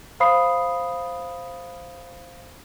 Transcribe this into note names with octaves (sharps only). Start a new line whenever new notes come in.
C5 F5 B5 D#6 C7